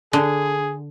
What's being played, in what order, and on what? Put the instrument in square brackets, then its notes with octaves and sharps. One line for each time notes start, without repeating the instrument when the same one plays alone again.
[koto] D3 [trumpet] G#4